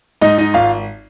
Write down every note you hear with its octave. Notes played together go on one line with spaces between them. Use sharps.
G#2 D#4 D#5
D#4 D#5
G#1 F4 F5